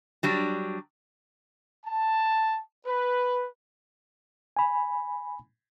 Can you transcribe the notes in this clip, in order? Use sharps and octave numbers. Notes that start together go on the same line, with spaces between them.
F#3 G3 D4
A5
B4
G#5 B5